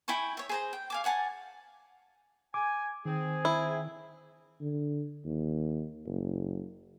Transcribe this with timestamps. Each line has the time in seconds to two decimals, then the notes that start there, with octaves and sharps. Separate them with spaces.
0.08 E4 G5 G#5 C#6
0.37 C#5 E5
0.49 G#4 C5 A#5
0.73 G5
0.90 F5 G#5 D6
1.04 C#5 F#5 G#5 A5
2.54 G#5 D6
3.05 D#3 C4 G#4
3.45 E4
4.61 D3
5.25 D#2
6.06 F#1